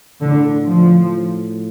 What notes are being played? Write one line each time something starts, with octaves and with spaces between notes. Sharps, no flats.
A2 D3
F3